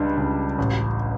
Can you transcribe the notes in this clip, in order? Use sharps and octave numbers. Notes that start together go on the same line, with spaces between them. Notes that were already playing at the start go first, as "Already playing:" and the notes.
Already playing: C#2 G3 D4
C#2
A1